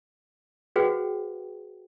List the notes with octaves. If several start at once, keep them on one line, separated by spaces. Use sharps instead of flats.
F#4 G#4 B4 C5 F#5 G5